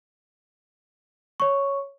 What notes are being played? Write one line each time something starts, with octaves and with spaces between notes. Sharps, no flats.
C#5 C#6